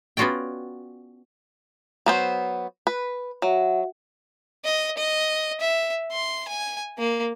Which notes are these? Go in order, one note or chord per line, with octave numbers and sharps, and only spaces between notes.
B3 C#4 F4 F#4 D5 G5
F#3 B3 C5
B4
F#3 F#4 E5 F#5
D#5
D#5
E5
C6
G#5
A#3